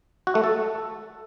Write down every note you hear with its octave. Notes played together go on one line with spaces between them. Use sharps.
F#4
A3
A4